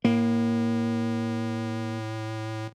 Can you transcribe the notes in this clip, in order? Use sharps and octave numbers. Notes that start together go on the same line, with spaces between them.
A2 A#3